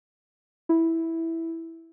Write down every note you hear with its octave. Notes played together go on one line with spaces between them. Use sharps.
E4